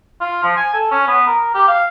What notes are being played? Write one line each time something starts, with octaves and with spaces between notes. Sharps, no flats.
F4
F3
G#5
A4
C#4
B3
A#4
G4
F5